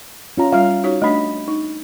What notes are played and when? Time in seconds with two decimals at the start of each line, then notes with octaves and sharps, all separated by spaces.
0.37 C#4 F4 A#5
0.53 G3 F4 F5
0.84 D#4 F#4 C#5
1.02 A3 D4 D#5 B5
1.48 D#4